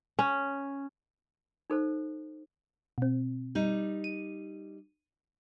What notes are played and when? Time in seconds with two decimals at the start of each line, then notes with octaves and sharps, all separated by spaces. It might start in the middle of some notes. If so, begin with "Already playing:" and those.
0.19 C#4
1.70 D#4 A4 C5
2.98 B2 C4
3.55 G3 D#4
4.04 D#7